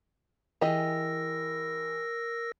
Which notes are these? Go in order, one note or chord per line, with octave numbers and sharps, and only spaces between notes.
E3 G4 G#4 A#4 D#5 E6 A#6